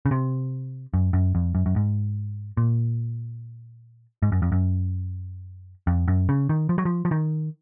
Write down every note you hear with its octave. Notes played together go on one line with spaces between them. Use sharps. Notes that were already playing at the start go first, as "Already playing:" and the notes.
C#3
C3
F#2
F#2
F2
F#2
F#2
G#2
A#2
G#2
F#2
F2
F#2
F2
F#2
C#3
D#3
F3
F#3
F3
F3
D#3